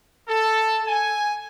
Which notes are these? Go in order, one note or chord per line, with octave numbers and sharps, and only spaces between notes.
A4
G#5